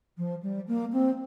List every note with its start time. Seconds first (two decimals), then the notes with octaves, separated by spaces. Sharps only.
0.17 F3
0.42 G3
0.67 A#3
0.92 C4